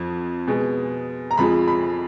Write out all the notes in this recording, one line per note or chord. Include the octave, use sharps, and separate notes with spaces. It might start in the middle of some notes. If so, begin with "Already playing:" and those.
Already playing: F2 F3
B2 G#3
A#5
F2 F3 G#3 B5
B5